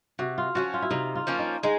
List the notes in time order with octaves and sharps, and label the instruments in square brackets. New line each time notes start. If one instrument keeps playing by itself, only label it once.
[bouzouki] C3 [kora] F#4
[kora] F4
[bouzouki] F3 A#3 C#4 [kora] F#4
[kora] F4
E4
[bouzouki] C3 [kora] D#4
[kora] F4
[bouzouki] F3 A#3 C#4
[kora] D#4
[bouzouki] G#3 [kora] D#4